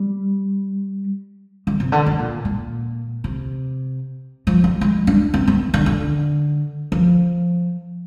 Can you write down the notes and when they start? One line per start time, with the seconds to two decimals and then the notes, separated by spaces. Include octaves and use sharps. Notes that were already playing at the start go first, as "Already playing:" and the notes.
Already playing: G3
1.67 D3
1.80 C3
1.92 D3
2.06 D3
2.19 A#2
2.45 A#2
3.24 C3
4.47 F3
4.64 G3
4.81 G#3
5.07 D4
5.34 C4
5.48 C4
5.60 D#3
5.74 D3
5.86 D3
6.92 F3